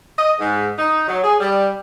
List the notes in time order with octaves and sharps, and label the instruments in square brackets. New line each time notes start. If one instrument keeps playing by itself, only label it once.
[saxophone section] D#5
G#2
D#4
F#3
G#4
G3